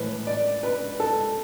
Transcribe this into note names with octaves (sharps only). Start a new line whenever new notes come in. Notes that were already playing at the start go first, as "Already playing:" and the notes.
Already playing: A2 E3 B4
D5
B4
A4